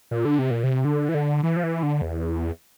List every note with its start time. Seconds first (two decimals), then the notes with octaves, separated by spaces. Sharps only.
0.11 A#2
0.25 D3
0.39 C3
0.51 A#2
0.64 C3
0.85 D3
1.09 E3
1.14 D3
1.43 E3
1.56 F3
1.63 E3
1.83 D3
2.01 E2